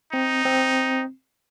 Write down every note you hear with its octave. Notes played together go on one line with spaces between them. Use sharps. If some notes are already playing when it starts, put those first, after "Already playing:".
C4 D#4
C4